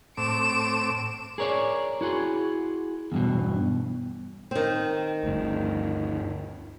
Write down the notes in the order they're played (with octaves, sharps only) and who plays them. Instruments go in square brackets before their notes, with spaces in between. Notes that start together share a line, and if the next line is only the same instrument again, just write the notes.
[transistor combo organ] A2 C4 D6 [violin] D7 E7
[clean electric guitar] G#4 A#4 C#5 D5
E4 F#4 G#4 C6
E2 G2 B2
[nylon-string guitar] D#3 C4
[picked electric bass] G1 D2